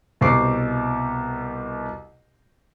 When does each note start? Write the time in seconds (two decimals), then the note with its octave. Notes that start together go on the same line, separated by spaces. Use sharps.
0.21 C2 B2 C5 C#6 D6 C7